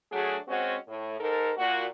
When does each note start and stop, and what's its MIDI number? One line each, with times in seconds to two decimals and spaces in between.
0.12 0.37 54
0.12 0.37 57
0.12 0.37 62
0.12 0.37 66
0.12 0.37 68
0.48 0.76 56
0.48 0.76 60
0.48 0.76 61
0.48 0.76 66
0.88 1.16 45
1.20 1.51 44
1.20 1.51 69
1.20 1.51 70
1.57 1.84 46
1.57 1.84 66